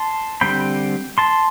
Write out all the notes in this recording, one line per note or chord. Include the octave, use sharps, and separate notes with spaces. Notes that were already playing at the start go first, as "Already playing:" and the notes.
Already playing: A5 C6
D3 G3 C4 G5 B5
A5 C6